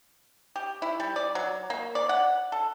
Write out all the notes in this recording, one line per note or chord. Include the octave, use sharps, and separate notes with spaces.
G4
E4
G3
D5
F#3
A#3
D5
F#5
A4